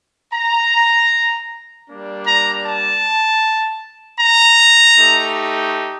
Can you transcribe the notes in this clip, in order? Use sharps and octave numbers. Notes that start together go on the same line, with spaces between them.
A#5
G3 A#3 D4
A#5
A5
A#5
A3 D#4 G4